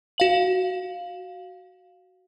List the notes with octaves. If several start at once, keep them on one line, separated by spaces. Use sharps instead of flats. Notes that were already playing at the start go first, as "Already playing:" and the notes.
F#4 F5 F#7